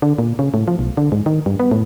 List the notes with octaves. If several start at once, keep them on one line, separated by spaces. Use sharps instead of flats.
D3
A#2
C#3
A2
F3
B1
D3
G#2
D#3
G2
B3
A2